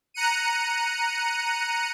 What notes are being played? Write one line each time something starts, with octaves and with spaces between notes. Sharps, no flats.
A#5 F#6 C#7 D#7